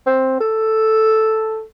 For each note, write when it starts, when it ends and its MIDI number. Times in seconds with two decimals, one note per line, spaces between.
0.07 0.41 60
0.41 1.62 69